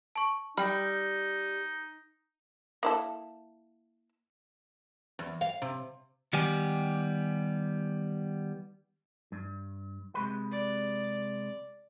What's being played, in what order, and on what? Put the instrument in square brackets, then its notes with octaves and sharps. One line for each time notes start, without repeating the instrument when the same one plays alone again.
[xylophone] A5 C#6
[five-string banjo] G3 B5 [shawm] D#4 [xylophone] G5 F6
[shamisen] A#3 E4 A4
[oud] E2
F5
C3
[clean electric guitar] D#3 G3 B3 G4 G#5
G2
C3 G#3 B4
[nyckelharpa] D5